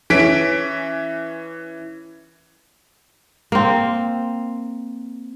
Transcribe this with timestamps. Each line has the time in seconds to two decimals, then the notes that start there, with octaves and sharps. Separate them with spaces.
0.10 E3 C#4 B6 D7
3.52 A#3 C4